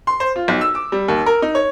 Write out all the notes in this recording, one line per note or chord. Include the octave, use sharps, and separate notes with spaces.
C6
C5
F4
B1
E6
D6
G3
D#2
A#4
D#4
C#5